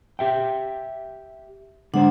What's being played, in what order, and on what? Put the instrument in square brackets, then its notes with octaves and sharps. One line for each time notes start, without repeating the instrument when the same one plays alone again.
[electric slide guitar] G4 E5 G5
[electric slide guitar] D3 G#3 C5 [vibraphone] D4 F#5